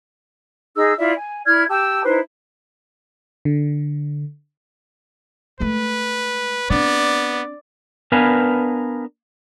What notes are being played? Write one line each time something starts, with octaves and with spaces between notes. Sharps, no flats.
D#4 G#4 E6
E4 F4 D5 E5
G#5
E4 D5 F6 G#6
G4 A5 E6
D#4 E4 B4 C5
D3
G#3 A3 B4
B3 C4 D4 D5
B3 D4 A#4 B4 F5 G#5